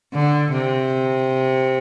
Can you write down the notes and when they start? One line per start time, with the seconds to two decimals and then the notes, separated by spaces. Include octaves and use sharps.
0.14 D3
0.52 C3